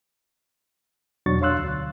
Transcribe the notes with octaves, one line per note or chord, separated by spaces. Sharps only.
E2 B2 F#3 D4 C#6 A6
C#5 F5 C6 E6 F#6
D2